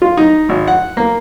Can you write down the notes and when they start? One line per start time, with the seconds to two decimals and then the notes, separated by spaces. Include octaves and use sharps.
0.02 F4
0.17 D#4
0.49 G#1
0.68 F#5
0.97 A#3